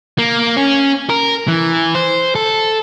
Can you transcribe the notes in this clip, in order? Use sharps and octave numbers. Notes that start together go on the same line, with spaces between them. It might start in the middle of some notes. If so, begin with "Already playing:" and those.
A#3
C#4
A#4
E3
C5
A4